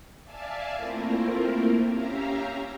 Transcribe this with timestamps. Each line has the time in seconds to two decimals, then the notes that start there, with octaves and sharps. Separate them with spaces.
0.23 D5 E5 F5 G#5 A5
0.75 A3 A#3 C4 E4 F4 A#4
1.86 C#4 G4 E5 F5 A#5